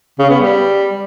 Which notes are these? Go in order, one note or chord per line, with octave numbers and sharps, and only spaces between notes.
C#3
B3
G3